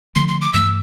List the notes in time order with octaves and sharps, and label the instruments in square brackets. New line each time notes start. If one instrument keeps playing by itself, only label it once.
[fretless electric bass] D3 F3 A3 [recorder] C6
[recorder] C6
D6
[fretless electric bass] G2 E3 A3 [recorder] E6